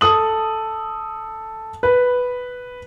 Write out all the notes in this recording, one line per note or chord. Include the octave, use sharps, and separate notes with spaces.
A4 D#6 F#7
B4